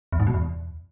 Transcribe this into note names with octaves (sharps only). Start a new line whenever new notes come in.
E2
G#2
B2
E2